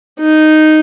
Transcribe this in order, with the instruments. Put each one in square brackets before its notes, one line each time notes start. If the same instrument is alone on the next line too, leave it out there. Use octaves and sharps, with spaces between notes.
[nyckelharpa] D#4